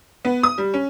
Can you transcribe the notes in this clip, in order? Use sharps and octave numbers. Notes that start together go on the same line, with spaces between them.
B3
D#6
G3
C#4